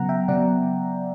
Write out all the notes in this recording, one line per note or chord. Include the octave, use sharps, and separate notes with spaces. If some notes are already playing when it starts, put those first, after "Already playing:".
Already playing: C#3 F#3 B3 F#5 A#5
E5 G5
C#3 F#3 B3 D5 F#5